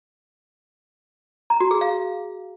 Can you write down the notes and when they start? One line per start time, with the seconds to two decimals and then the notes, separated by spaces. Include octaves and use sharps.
1.50 A#5
1.60 F#4
1.71 G#4
1.81 F5